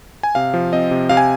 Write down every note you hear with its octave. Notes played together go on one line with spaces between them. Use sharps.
G#5
C3 F5
F3
C4 D#5
C3
C3 F5
G#5